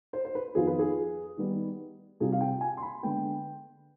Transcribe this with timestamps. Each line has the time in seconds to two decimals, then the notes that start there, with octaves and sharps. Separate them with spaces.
0.13 C5
0.25 C5
0.35 B4
0.55 F2 D#3 B3 F4 G#4
0.67 B4
0.79 G#4
1.37 D#3 G3 B3 D#4
2.20 C3 G3 C4 F4 G#4
2.32 F5
2.41 G5
2.61 G#5
2.77 C6
2.83 B5
3.03 D3 G#3 B3 G5